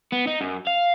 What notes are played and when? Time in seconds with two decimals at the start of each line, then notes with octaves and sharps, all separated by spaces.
0.12 B3
0.27 D#4
0.41 F#2
0.67 F5